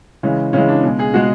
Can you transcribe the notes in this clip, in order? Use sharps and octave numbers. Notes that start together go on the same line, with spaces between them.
C#3 E3 G#3 C#4
C#3 E3 G#3 C#4
D4
B2 G#3
G#4
B2 G#3 F#4